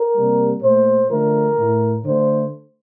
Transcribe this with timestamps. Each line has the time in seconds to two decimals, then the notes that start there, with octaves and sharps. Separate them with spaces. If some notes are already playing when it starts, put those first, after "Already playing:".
Already playing: A#4
0.14 C3 G3 A#3
0.62 A#2 A3 C5
1.09 D3 F3 A3 A#4
1.58 A2 A3
2.05 D3 A3 C5